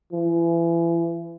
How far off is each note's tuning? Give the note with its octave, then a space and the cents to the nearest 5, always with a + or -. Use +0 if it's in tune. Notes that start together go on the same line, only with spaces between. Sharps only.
E3 +35